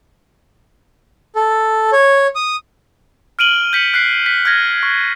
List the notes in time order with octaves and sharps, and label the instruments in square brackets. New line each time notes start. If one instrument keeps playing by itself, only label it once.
[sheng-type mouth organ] A4
C#5
D#6
[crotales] F6 D7 D#7 F#7 G7
G6 B6 C#7 F#7
F#6 B6 C7
B6
F6 G6 G#6 A#6
C#6